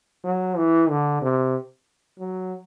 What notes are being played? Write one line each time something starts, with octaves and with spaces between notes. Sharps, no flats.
F#3
E3
D3
C3
F#3